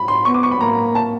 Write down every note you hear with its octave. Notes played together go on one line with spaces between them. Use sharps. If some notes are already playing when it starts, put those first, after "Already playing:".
Already playing: B5
C6
B3 C#6
D6
C#6
B5
A#3 A#5
A5